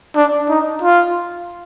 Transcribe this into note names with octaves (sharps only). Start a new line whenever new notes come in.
D4
D#4
F4